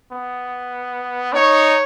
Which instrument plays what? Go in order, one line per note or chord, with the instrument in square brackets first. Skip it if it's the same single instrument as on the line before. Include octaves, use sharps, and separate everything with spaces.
[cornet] B3
[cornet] D#4 [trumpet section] C#5